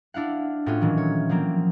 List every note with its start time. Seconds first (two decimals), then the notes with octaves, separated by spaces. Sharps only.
0.14 D4 E4 F5 F#5
0.66 A2 C#4 F4 F#4
0.81 A#2 D#3 E3 F#3
0.98 C#5
1.29 F3 F#3 A#3 C4